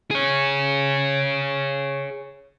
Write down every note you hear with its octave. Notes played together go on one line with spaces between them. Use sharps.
G#4 C#5